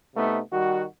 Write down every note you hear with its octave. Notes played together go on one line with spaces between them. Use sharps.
C3 A3 B3 D#4
D#3 G3 F#4